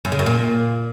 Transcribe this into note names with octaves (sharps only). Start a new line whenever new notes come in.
F#2
C#3
F#2
A#2